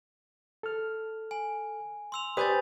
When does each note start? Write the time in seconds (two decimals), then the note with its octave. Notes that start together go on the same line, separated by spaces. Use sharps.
0.63 A4 F6
1.31 G#5
2.12 C6 E6 F7
2.37 G4 B4 C5 D5 G#5 D#6 G6 A6